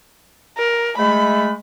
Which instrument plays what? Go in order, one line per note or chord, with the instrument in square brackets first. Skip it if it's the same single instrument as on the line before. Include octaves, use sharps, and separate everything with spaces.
[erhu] A#4
[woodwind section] G#3 A3 [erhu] B5